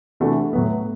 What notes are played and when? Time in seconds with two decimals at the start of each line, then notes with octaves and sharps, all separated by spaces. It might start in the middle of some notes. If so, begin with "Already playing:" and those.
0.20 C3 E3 A3 D4 F#4
0.53 A2 F#3 B3